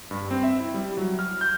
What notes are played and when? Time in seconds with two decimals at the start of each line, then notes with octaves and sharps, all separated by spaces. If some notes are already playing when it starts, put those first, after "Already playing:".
0.11 G2
0.31 C4
0.43 E5
0.60 E4
0.74 G3
0.97 F#3
1.19 F6
1.41 G6